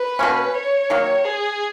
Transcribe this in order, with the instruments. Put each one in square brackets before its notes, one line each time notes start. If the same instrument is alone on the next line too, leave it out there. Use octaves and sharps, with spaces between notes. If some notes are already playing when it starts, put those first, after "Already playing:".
Already playing: [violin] B4
[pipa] B2 A#3 C#4
[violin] C#5
[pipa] D#3 F#3 A#3
[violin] G#4